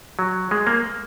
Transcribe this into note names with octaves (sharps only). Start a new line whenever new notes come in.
F#3
G#3
A#3